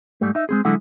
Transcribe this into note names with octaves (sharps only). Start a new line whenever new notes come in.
G#2 G3 A3
D#4 E5
G#3 C4 G#4
D3 F#3 G#3 E4 A4 F#5